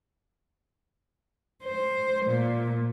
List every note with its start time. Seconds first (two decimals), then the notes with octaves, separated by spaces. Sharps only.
1.64 C5
2.27 A#2